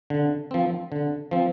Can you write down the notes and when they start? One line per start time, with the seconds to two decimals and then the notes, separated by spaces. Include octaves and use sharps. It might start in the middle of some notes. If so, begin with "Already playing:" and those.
0.10 D3
0.51 F3 C4
0.92 D3
1.31 F3 C4